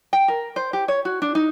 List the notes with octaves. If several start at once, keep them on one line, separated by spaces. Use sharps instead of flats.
G5
A#4
C5
G4
C#5
F#4
D4
D#4